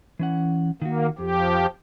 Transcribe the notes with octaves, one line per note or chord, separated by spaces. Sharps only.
E3 C#4 F#5
D#3 A#3 F#4
F2 F3 G4